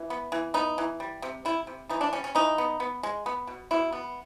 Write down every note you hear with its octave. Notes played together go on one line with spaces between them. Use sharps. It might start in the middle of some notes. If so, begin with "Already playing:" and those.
Already playing: E3
B3
E3
B3 D#4
E3
G3
C3
C3 E4
C3
E3 D#4
D4
G3 C#4
C#4
E3 D#4
B3
B3
G#3
B3
B2
B2 E4
B3